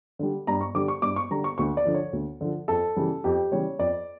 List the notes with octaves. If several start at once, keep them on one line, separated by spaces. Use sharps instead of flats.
D3 G3
G2 A#5
C#6
D3 G3 D6
C#6
G2 D6
C#6
D3 G3 A#5
C#6
D2 C#6
D5
D3 F3
C#5
D2
D3 F3
F2 A4
C#3 E3 G3
F2 G4
C#3 E3 G3 C#5
F2 D5